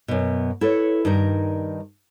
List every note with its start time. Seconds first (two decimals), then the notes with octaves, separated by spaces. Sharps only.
0.08 F#2 B2
0.61 E4 A4 B4 C#5
1.05 G2 D#3 D#4 A#4